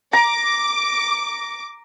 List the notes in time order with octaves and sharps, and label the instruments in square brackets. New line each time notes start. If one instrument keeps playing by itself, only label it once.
[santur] A#5 [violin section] D6